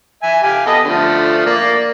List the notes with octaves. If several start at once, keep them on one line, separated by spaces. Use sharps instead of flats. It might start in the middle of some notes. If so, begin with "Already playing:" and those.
E5 G#5
G4 F5 G#5
B3 A4 D#5
D3 F3 A3
A#3 D5